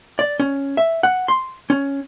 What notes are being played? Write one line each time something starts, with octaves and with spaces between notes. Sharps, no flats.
D5
C#4
E5
F#5
C6
C#4